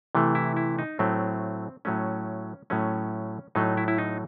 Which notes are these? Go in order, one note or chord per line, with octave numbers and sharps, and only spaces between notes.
C3 E3 A3
E4
E4
D#4
A2 F#3 A3 C4
A2 F#3 A3 C#4
A2 F#3 A3 C#4
A2 F#3 A3 D#4
E4
E4
D#4